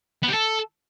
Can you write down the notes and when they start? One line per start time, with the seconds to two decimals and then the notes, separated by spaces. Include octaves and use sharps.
0.23 B3
0.29 G4
0.34 A4